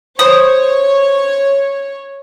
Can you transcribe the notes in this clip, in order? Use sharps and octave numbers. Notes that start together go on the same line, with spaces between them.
C5 C#5 D#6